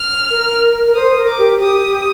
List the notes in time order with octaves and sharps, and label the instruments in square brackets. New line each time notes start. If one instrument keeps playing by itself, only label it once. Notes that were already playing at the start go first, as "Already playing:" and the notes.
Already playing: [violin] F6
[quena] A#4
A#4
[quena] C5 [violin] D#6
[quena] A#4
[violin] D6
[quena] G4
[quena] G4 [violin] D#6